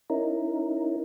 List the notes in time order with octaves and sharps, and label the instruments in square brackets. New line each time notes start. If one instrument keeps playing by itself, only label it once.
[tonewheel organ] C#4 D#4 E4 A#4